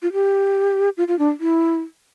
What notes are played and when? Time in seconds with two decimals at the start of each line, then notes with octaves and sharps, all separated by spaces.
0.02 F4
0.13 G4
0.97 F4
1.08 F4
1.19 D4
1.40 E4